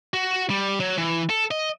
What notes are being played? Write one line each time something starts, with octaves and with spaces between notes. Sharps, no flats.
F#4
G3
F#3
E3
A4
D#5